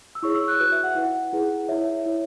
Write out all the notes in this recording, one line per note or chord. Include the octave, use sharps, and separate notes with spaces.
E6
E4 G#4 C#5 C#6
E6
F#6
F#4 B4 F#6
E5
F#5
E4 B4 F#5
E4 G#4 B4
E4 C#5 E5
E4 C#5